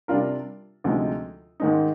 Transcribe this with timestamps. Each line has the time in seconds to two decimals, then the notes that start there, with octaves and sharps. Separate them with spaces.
0.08 C3 G3 D4 F4 A#4
0.84 D2 C3 F3 G#3 D#4
1.60 G#2 D#3 G#3 D#4